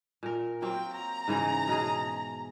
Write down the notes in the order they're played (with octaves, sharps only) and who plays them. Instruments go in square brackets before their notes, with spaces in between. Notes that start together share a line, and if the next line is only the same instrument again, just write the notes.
[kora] A#2 A#4
[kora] F#3 A#3 C4 [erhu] G5
[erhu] A#5
[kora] G#2 C#3 E3
B2 G#4